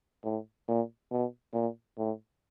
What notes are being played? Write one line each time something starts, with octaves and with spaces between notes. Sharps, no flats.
A2
A#2
B2
A#2
A2